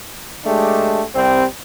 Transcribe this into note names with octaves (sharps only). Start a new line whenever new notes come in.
G#3 A3 D4 G4
C2 G3 C4